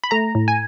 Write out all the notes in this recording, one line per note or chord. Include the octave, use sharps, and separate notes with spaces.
B5
A3 A#5
A2
G#5